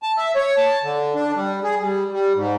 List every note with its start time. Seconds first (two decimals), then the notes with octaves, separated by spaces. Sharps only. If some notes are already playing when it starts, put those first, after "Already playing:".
0.03 A5
0.17 E5
0.36 C#5
0.57 A5
0.83 D3
1.15 D4
1.36 G3
1.64 G#4
1.80 G3
2.12 G3
2.35 G#2